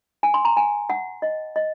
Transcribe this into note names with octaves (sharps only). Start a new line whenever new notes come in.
G#5
C6
A#5
G#5
F#5
D#5
D#5